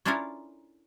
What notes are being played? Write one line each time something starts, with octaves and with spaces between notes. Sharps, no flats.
C#4 D4 E4 F4 A4 A#4